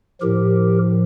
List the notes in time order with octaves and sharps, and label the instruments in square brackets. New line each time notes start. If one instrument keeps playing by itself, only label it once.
[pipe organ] A2 F3 G4 A#4